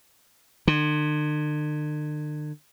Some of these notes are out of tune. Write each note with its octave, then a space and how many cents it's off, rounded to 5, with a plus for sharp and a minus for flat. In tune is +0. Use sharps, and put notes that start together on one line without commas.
D3 +45